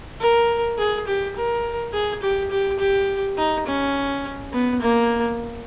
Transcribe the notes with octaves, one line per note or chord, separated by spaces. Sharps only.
A#4
G#4
G4
A#4
G#4
G4
G4
G4
D#4
C#4
B3
A#3